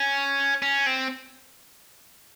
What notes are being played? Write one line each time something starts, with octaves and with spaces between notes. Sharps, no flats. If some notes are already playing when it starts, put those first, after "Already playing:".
Already playing: C#4
C#4
C4